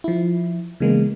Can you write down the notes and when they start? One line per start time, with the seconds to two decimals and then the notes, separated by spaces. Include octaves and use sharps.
0.04 F3 E4
0.80 C#3 E3 G#3 A#3 B3